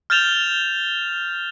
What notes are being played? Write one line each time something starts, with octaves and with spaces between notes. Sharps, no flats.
F6 G6 A6 E7 F7 G7